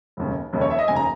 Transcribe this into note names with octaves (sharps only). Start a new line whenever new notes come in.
F1 D#2 C#3
F1 D#2 C#3
C#5
E5
D#5
F1 D#2 C#3 G#5
A#5